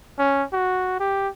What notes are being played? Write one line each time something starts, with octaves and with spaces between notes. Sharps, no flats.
C#4
F#4
G4